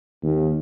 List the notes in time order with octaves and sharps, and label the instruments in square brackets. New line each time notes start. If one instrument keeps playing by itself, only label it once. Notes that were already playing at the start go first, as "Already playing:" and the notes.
[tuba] D#2